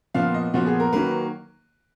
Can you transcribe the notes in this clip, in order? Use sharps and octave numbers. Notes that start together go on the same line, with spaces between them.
A#2 F3 B3 F5
D#5
A#2 F3 B3 F#4
G#4
A#4
D#3 F#3 A#3 B4